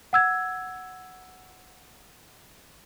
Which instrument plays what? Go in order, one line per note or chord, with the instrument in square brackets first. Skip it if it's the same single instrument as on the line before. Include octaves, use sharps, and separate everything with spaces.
[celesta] F#5 E6 G#6